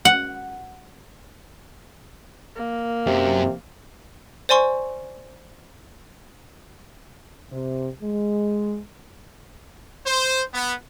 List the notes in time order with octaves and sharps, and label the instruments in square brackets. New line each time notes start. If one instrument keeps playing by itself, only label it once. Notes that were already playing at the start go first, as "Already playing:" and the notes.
[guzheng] F#5
[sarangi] A#3
[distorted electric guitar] F#2 [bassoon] C3
[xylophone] C5 D5 G#5 C6 C#6
[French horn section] C3
G#3
[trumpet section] C5
B3